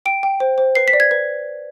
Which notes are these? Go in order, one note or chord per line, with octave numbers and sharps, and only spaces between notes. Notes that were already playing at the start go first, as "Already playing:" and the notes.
G5 D7
G5
C5
C5
B4 C7
B6
D5
G#6
B4